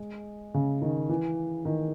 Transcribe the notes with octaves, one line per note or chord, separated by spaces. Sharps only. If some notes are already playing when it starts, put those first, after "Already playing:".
Already playing: G#3
C#3
D#3
E3
D#3